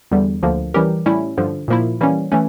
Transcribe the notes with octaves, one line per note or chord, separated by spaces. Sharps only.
E2 D3 G3
D2 D3 F3 A#3
E3 G3 C#4 G4 A#4
A2 G3 C#4 E4
G2 D3 F3
A#2 F3 A#3 E4
E3 G3 A#3 C#4
E3 A3 C#4